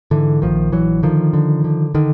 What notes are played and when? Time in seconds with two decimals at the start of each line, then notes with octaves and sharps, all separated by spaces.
0.11 G#2 D3 E3
0.42 A#1 D#3 F3
0.72 A#1 E3 F#3
1.03 D3 D#3 F3
1.33 D3
1.64 D3
1.95 D3 D#3